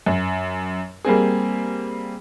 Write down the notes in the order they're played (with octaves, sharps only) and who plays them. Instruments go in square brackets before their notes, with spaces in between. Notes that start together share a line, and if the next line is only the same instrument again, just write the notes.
[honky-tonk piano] F#2
G3 A#3 C4 G#4